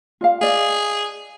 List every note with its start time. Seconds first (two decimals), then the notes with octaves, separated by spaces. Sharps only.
0.21 F4 D5 F5
0.41 G#4 D5 D#5 F5